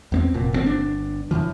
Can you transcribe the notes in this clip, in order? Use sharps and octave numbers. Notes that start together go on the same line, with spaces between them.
E2 A#3 C4
F1 A#2
G#1 C4
G1 D4
F#2 C#3 E3 F3